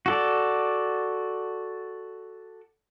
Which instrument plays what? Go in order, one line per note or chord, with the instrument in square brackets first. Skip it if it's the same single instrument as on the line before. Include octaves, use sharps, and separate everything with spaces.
[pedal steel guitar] F#4 A4 D5